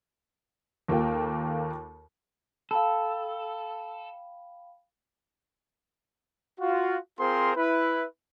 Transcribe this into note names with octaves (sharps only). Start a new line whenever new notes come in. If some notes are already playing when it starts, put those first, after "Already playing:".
D#2 A#3 F4 A4 G5
A4 F5 G5 B5
F4 F#4
C4 F4 G#4 A#4 C5 C6
E4 B4